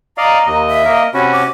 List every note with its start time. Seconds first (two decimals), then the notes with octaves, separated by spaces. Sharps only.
0.18 D5 D#5 F5 A#5
0.46 D#2 D#5
0.68 E5
0.85 A#3 A#4 D#5
1.14 C3 C#4 F#4 B5
1.32 D6